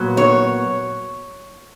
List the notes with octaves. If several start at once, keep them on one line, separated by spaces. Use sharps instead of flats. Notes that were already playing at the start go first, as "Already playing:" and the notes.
Already playing: A#2 F#3 B3
C#5